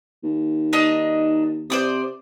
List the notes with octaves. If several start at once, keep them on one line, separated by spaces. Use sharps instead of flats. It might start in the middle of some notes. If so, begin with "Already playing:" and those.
D#2
D4 D#4 D#5
C3 C5 D5 D#6